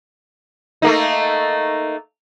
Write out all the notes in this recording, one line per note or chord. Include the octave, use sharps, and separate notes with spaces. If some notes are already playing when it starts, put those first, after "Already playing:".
A3 A#3 D#4